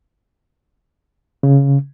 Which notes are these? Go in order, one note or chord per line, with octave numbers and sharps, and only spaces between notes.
C#3